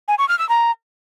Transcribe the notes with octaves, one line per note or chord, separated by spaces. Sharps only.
G#5
C#6
F6
E6
A#5